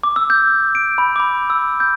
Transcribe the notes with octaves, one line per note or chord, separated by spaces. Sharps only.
D6
E6
G6
D7
B5
D6
B5
E6
G6